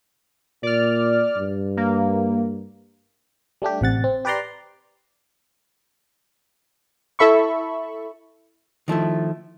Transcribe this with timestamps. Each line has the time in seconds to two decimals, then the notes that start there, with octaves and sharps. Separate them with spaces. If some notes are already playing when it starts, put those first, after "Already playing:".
0.63 A#2 D5 F6
1.36 G2
1.77 A#3
3.62 G3 A3 D4 G4
3.81 A1 C3 F#5 A6
4.04 C4
4.25 G4 B4 D5 A#5 C6
7.19 E4 A4 E5 B5 C#6
8.88 D#3 F3 A3 E4